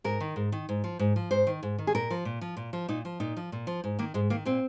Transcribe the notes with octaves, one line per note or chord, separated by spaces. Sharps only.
G#2 A#4
D#3
G#2
D#3
G#2
F3
G#2
F3
G#2 C5
D#3
G#2
D#3
G#4
A#2 A#4
F3
A#2
F3
A#2
F3
A#2 D#4
F3
A#2 D#4
F3
A#2
F3
G#2
D#3 A#3
G#2 G#3
D#3 A#3
A#2 C4